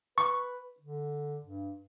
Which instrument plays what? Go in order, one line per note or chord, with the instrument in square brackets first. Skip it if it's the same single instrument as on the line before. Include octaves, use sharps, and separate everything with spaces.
[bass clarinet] B4 [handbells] C#6
[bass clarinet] D3
G2